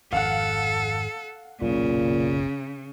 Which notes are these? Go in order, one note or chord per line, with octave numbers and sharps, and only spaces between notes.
G#1 F2 A4 F5 F#5
F#1 B1 A#2 C#3